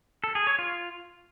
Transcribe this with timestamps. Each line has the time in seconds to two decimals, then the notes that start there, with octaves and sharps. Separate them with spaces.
0.24 A4
0.35 G#4
0.47 C#5
0.59 F4